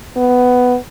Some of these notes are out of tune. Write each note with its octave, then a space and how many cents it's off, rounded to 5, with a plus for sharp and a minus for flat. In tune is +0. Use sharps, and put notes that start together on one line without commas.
B3 +10